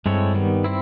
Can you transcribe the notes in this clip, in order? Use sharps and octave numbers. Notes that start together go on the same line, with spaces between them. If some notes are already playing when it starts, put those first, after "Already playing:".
G2 G#3 C4 E4 A4 C#5
D#3 G3 B3
C4 E4